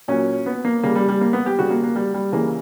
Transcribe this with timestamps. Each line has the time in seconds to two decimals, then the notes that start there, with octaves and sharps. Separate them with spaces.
0.08 A#2 F#3 C#4
0.46 B3
0.65 A#3
0.83 C#3 G3 A#3
0.95 G3
1.09 G3
1.21 A#3
1.33 B3
1.46 G4
1.58 C#3 G3 F#4
1.70 A#3
1.84 A#3
1.96 G3
2.14 G3
2.32 C#3 E3 G3 A#3